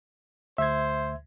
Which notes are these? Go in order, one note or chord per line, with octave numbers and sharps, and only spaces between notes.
D2 C5 E5 G#6